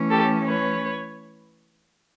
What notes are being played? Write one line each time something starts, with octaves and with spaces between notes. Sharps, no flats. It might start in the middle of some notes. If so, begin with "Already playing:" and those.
Already playing: E3 A3 C#4
G4 A4
B4 C#5